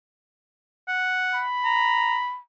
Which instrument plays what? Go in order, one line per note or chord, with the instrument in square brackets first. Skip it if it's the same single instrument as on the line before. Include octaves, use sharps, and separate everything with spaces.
[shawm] F#5
[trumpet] B5
[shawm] A#5